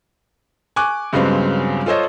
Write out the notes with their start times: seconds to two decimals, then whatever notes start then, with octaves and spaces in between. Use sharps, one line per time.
0.76 G#5 C#6 D6 F#6
1.13 G2 C#3 F#3 G#3 B3 C4
1.86 F4 A4 C5 C#5 D#5